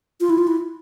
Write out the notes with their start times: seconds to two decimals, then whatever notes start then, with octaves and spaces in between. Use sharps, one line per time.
0.21 F4
0.30 E4
0.38 F4
0.47 E4